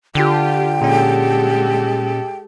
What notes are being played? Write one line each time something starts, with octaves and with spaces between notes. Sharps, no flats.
D3 F4 G4 G5
A#2 G#3 C#4 G4 A4